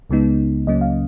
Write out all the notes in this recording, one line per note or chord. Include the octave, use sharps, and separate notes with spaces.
C#2 C#3 G#3 B3 D#4
C#2 C#3 F#3 A#3 C#4 D#5
F5